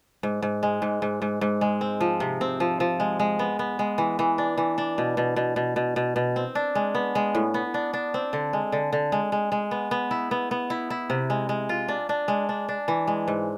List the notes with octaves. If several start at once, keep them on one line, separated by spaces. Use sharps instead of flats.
G#2
G#2
G#3
G#2
G#2
G#2
G#2
G#3
C4
F3
C3
C4
F3
F3
G#3
G#3
B3
B3
G#3
E3
E3
D4
E3
D4
B2
B2
B2
B2
B2
B2
B2
C4
D4
G#3
B3
G#3
A2
B3
D4
D4
C4
D3
G#3
D3
D3
G#3
G#3
G#3
B3
B3
E4
B3
B3
E4
E4
C3
G#3
G#3
F4
D4
D4
G#3
D4
D4
E3
G#3
G#2